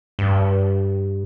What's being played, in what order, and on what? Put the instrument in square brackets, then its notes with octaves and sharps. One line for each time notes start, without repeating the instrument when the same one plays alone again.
[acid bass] G2